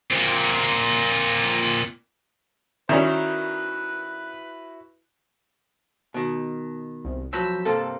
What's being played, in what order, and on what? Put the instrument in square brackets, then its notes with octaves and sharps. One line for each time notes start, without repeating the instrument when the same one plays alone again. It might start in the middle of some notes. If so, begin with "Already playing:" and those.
[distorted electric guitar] A#2 C4
[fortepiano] D#3 G3 C#4 [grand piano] E4 F#4 [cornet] B4
[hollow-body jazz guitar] B2 D#3
[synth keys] C2
[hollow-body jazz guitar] F2 F#3 B4 [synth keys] E6 G6 B6
[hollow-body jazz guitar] G2 C3 A#3 [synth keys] A4